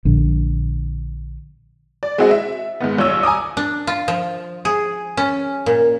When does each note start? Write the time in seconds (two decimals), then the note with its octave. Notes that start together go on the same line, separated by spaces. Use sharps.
0.05 A#1 D3
2.03 D5
2.18 G#3 C4 E4 F#4 G#4 D#5
2.31 E5
2.81 G#2 D#3 B3
2.98 C2 F4 C#5 E6
3.23 G#5 A#5 D6 D#6
3.57 D4
3.87 F4
4.08 F3
4.65 G#4
5.17 C#4
5.66 A#2